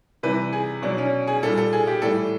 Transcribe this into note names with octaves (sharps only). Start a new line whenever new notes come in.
C3 E3 G3 B4
G#4
B2 F#3 D4
C#4
G#4
A#2 G3 A4
A4
G#4
G4
A2 E3 G3 A4